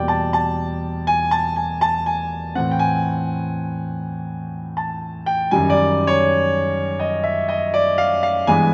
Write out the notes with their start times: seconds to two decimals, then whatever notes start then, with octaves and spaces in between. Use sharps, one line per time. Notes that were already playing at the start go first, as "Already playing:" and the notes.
Already playing: E2 B2 G3 A#3 D5 G5
0.08 A5
0.33 A5
1.07 G#5
1.31 A5
1.56 G#5
1.81 A5
2.06 G#5
2.55 A2 E3 A3 C4 F#5
2.71 G5
2.79 G#5
4.77 A5
5.26 G5
5.51 F#2 D#3 G3 G#5
5.70 D5
6.07 C#5
6.99 D#5
7.24 E5
7.49 D#5
7.74 D5
7.98 F5
8.23 F5
8.47 G2 E3 G#3 B3 G#5